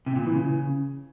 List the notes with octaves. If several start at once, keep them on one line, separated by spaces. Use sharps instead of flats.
C3
A#2
E3
C#3